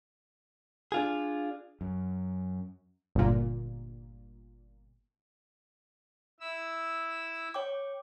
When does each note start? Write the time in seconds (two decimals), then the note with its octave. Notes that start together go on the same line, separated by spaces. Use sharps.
0.92 D4 F4 G#4
1.81 F#2
3.15 G1 A#2
6.40 E4 E6
7.54 C#5 G5 D6